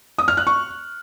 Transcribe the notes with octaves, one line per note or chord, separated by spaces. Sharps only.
D#6
F6
F#6
C#6